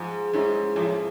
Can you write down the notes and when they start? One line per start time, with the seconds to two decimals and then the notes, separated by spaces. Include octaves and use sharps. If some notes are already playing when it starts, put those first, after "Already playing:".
Already playing: G#2 F3
0.34 G#2 G#3 C#4 E4
0.76 A2 F3